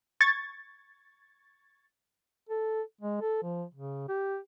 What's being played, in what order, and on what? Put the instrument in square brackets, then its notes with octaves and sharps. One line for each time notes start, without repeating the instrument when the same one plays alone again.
[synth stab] C#6 G#6 A6
[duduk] A4
G#3
A4
F3
C#3
G4